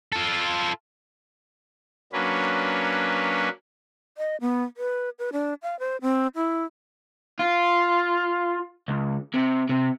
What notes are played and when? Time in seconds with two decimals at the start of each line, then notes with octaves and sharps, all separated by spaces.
0.13 F4 A4
2.13 F#3 A#3 C#4 D4 B4
4.18 D#5
4.41 B3
4.77 B4
5.19 B4
5.33 D4
5.62 F5
5.79 C5
6.02 C4
6.36 E4
7.39 F4
8.88 C#2
9.34 C3
9.69 C3